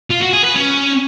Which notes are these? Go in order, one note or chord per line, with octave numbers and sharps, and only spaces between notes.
F4
F#4
G#4
B4
C#4